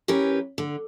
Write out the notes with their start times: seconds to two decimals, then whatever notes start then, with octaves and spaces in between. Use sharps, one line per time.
0.08 E3 C#4 G4 A#4 B4
0.58 D3